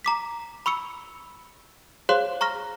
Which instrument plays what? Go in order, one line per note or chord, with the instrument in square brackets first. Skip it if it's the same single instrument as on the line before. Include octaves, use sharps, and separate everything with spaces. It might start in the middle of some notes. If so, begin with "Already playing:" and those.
[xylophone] A#5 D6 B6
B5 C#6 E6 C#7
G#4 C5 C#5 F5 C6 F#6
A#5 C#6 F6 A#6